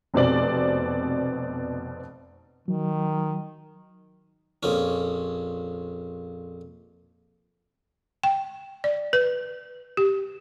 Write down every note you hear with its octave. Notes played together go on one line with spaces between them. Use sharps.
F1 B2 C4 D5 F#7
D#3 F#3
A#1 F2 C#4
G5
D5
B4
G4